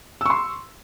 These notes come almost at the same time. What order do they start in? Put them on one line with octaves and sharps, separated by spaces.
E6 C#6 C6